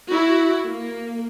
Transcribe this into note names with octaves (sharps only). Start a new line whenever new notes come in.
E4 F#4
A#3